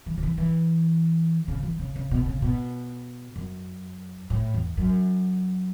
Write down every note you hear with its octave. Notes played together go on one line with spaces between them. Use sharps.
E3
C#3
E3
E3
C#3
E3
C#3
C#3
B2
C#3
B2
F#2
A2
E2
F#2